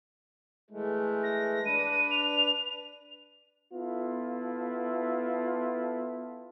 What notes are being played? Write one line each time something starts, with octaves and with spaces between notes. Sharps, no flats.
E3 G#3 A3
A#6
D4 B4 D#7
F7
B3 E4 F4 A4